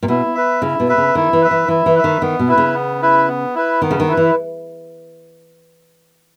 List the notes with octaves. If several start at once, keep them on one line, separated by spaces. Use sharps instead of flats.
A#2
B2 E4
B4 E5
C#3 E4
B2
B4 E5
C#3
D#3 E4
E3
B4 E5
E3
E3 E4
E3
B4 E5
D#3
D#3 B3
B2
E4 B4
C#3
B3
E4 B4
B3
E4 B4
D#3 B3
C#3
D#3
E4 B4
E3